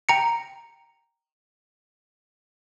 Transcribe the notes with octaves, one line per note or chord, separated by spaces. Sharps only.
G5 A#5 C#7